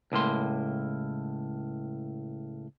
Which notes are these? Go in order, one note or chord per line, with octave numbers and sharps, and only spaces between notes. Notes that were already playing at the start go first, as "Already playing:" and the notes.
C#2 A2 A#3 C6